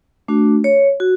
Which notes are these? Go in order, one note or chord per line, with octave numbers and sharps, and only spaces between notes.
A3 D4 F#4
C#5
F#4